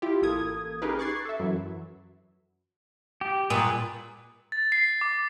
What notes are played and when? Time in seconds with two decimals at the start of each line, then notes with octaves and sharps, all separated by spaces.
0.02 E4 F4 G4
0.22 A1 A#3 A4 D#6 G#6
0.82 C#4 D#4 G4 G#4 A#4 B4
0.99 C#6 D6 F#6 G#6 A6 C7
1.25 A4 E5
1.40 F#2 E3 F#3
3.21 G4
3.50 A#2 G#4 B4
4.52 A6
4.72 C7
4.84 C7
5.01 D6